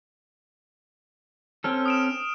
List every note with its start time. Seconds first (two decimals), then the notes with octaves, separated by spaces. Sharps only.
1.64 C4 C#4 A4 F6
1.86 D#6 D7 E7